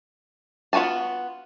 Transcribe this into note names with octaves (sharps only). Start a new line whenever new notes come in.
B3 F4 F#4 G#5 A5